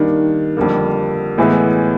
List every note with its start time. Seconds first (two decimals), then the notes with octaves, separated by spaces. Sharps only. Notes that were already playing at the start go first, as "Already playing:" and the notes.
Already playing: D#3 G3 A#3 D4
0.57 F2 D3 G3 A#3
1.38 A2 E3 G#3 B3 E4